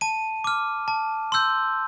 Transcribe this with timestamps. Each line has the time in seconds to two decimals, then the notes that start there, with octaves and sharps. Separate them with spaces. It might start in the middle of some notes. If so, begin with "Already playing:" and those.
0.01 A5 D#7
0.44 D6 F6
0.88 A5
1.32 C6 E6 G6